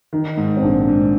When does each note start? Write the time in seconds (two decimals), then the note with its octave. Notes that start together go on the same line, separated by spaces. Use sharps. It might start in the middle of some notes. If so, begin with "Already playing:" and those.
0.13 D#3 D#4
0.37 G#2
0.57 C4
0.62 A#1 D4
0.88 G#2